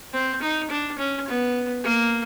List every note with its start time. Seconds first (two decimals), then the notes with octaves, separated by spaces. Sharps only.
0.13 C4
0.42 D#4
0.70 D4
0.99 C#4
1.28 B3
1.84 A#3